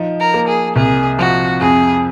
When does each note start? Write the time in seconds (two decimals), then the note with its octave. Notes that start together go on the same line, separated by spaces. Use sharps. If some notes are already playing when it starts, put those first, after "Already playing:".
Already playing: F3 D#4
0.20 A#4
0.34 A#3
0.48 G#4
0.76 C2 G#4
1.19 F3 F#4
1.61 F2 G#4